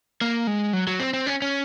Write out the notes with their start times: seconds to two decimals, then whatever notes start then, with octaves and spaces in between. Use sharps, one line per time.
0.21 A#3
0.47 G#3
0.73 F#3
0.87 F#3
1.00 C4
1.14 C4
1.27 C#4
1.42 C#4